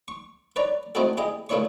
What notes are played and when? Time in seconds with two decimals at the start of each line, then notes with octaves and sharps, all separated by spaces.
0.08 C#6
0.56 B4 C#5 D5 A#5
0.95 A3 C4 D#4 E4 F#4 A4
1.17 E4 G4 G#4 D#5
1.49 A#2 A3 D4 E4 C#5 C#6